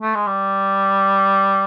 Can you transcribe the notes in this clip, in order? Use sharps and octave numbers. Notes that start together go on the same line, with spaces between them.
A3
G#3
G3